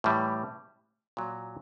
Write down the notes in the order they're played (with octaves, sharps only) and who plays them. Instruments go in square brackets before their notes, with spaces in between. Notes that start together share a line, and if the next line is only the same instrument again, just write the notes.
[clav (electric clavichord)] A2 E3 G3
A#2 F#3